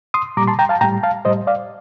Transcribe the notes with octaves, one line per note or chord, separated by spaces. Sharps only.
C6 D#6
A#2 G3 A#5 D6
A5 C6
G5 A#5
F5 A5
A2 G3 G5 A#5
F5 A5
A2 G3 C5 D#5
D5 F5